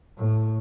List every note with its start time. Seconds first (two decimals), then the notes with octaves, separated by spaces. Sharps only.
0.18 A2